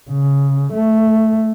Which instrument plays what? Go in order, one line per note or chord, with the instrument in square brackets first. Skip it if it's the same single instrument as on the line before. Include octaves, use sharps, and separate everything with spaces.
[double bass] C#3
A3